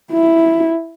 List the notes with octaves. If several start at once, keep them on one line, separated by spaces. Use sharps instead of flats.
E4